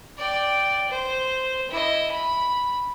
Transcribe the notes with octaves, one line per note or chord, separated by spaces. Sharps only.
D5 G5
C5
E4 D#5
B5